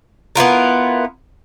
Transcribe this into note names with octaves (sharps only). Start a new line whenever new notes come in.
B3 E4 F4 A#4